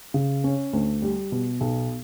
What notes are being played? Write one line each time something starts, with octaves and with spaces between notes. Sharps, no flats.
C#3
C#4
D2
G3
B2
B1